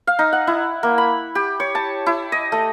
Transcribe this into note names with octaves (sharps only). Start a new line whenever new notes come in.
F5
D#4
F#5
E4
A#3
B5
G4
C#5
A5
E4
D#5
A3